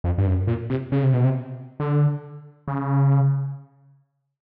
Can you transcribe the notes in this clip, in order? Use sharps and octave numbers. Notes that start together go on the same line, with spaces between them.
F2
G2
F#2
A#2
C3
C#3
C3
B2
C3
D3
C#3